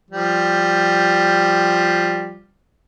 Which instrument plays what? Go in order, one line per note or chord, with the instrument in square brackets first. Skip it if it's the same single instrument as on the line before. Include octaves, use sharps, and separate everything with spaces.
[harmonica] F3 G3